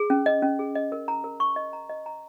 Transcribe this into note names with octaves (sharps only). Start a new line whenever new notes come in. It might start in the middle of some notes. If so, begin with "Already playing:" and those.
Already playing: G#4
C#4
D#5
C#4
G#4
D#5
A#4
A#5
A#4
C#6
D#5
A#5
D#5
A#5